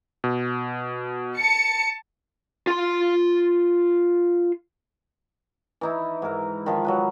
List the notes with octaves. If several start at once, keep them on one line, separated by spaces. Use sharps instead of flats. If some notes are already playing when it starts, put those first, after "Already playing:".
B2
A5 C#7
F4 C6
E3 D#4 E4
G#2 A#4
D#3 F3
F#3 G#3 B4